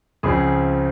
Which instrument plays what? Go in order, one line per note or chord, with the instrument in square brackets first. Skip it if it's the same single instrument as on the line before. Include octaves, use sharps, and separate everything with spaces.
[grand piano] C#2 C#3 F3 C4 G#4